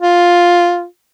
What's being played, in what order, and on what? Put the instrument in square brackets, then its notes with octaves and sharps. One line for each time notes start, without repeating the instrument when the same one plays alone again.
[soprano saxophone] F4